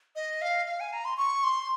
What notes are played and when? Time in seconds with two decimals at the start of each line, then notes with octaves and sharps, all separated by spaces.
0.16 D#5
0.42 F5
0.66 F5
0.80 G#5
0.93 A#5
1.05 C6
1.18 C#6
1.44 C6